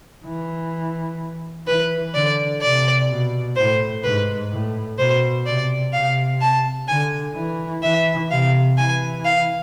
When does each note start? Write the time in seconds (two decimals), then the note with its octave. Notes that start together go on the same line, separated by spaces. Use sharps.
0.25 E3
1.67 E3 B4
2.14 D3 D5
2.61 C3 D5
3.09 B2
3.56 A2 C5
4.04 G#2 B4
4.51 A2
4.98 B2 C5
5.46 C3 D5
5.93 C3 F5
6.41 A5
6.88 D3 G#5
7.35 E3
7.83 E3 E5
8.31 C3 F5
8.77 E3 G#5
9.25 F5